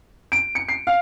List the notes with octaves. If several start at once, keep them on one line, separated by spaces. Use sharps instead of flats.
D7
C#7
C7
F5